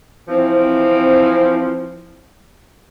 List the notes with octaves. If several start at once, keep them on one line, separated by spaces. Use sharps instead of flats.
E3 F3 C4